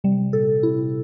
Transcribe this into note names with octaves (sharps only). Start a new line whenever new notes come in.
C3 G3
A#2 A4
C3 E4